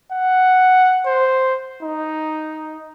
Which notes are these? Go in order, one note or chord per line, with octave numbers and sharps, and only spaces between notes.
F#5
C5
D#4